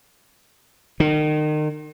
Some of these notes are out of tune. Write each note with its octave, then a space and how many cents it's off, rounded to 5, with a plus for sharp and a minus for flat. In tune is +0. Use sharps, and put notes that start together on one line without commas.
D#3 -35